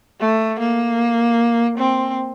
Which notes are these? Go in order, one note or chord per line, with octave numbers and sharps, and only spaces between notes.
A3
A#3
C4